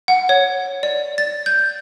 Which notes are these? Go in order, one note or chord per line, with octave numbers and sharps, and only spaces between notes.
F#5
C#5
D5
A6
G6